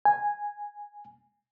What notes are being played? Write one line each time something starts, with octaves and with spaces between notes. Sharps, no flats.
G#5